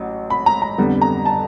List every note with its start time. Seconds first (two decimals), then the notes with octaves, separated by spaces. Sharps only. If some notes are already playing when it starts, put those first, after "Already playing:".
Already playing: A1 F#3
0.30 B5
0.46 A#5
0.62 A#5
0.78 F2 D3 G3 B3
1.02 A#5
1.25 A5